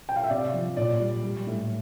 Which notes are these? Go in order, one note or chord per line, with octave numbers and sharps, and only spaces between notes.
G5
F5
E5
C3 D5
F3
A#2 D5
G3
G3
A2